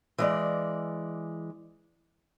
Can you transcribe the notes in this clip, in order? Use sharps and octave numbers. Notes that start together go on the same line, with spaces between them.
E3 G#3 D5